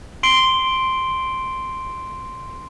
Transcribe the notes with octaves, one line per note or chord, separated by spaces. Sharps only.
C6 C7 D7 G7